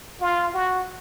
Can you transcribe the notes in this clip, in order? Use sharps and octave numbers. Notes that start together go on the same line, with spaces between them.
F4
F#4